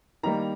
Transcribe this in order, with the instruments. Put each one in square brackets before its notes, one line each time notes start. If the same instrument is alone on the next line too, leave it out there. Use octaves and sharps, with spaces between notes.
[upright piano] D#3 G3 A#3 A#5